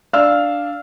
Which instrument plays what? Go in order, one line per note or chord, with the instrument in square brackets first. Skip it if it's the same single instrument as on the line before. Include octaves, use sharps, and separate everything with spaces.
[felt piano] D4 F5 E6 F6